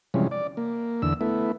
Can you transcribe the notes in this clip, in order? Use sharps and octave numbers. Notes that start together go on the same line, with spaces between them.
C3 E3 F3 G3 G#3 C#4
D5
A#3
E2 D3 E6
A3 B3 E4